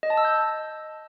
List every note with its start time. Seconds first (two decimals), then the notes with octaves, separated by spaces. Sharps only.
0.03 D#5
0.10 A5
0.17 E6
0.25 G6